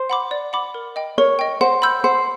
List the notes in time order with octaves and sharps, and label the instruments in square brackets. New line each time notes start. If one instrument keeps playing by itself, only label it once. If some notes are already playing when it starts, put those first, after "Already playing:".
Already playing: [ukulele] C5
[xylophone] F#5 B5 D6
D5
F#5 B5 D6
A#4
D#5 G5
[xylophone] A#4 [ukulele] C#5
[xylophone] D#5 G5
[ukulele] C5 [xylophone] F#5
[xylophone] B5 E6 G6
[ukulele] C5 [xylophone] F#5